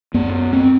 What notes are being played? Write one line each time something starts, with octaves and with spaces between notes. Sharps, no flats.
F#2 B3
C4